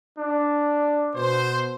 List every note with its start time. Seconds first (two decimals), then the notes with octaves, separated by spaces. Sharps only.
0.18 D4
1.13 B2 C5